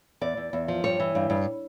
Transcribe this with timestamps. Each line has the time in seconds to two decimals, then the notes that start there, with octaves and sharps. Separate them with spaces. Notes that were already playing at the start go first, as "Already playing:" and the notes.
0.21 E2 D5
0.37 E2
0.53 E2
0.68 F3
0.84 G2 C#5
1.00 E3
1.15 G2
1.30 G2